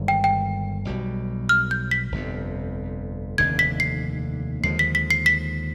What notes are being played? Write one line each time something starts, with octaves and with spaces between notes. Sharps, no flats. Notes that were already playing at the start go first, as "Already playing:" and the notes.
Already playing: G1 G2 D#3 G#3
G5
G5
B1 B2 G3
F6
G6
B6
G1 F2 C3
F1 D#2 D3 G#6
B6
C7
D#2 D3 F3 G#3 C7
B6
B6
C7
B6